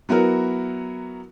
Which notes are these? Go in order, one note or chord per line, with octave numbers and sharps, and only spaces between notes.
F#3 B3 E4 F#4 A#4